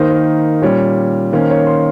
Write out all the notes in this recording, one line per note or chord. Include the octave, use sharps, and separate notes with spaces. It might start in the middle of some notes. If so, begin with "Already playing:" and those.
Already playing: D#3 A#3 D#4 C5
C5
A#2 G3 C#4 C#5
D#3 A#3 C#4 C5
C#5
C6